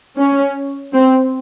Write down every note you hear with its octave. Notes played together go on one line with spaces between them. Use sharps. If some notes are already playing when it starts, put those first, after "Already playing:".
C#4
C4